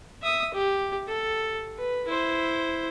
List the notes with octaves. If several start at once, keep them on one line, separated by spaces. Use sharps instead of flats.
E5 D#6
G4
A4
B4
E4 C5